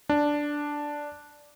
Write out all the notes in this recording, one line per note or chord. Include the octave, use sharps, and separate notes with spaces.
D4